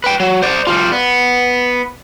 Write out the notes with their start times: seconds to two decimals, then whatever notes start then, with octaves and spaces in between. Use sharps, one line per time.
0.04 B4 G5
0.20 F#3
0.42 C5 D5
0.67 G3 F4
0.92 B3